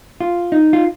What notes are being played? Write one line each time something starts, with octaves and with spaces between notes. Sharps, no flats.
F4
D#4
F4